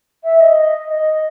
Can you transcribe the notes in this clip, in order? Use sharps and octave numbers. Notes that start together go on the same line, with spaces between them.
E5
D#5
D#5